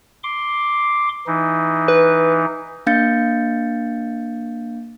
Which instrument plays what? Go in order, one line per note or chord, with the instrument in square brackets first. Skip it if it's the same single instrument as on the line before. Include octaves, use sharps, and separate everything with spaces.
[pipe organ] C6 D6
E3 D#4
[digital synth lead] B4
[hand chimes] A#3 D4 F5 G6 A6 C#7